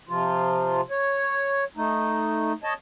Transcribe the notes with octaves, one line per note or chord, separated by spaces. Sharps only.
C3 F3 F4
C#5
A3 D#4
C#5 D#5 A5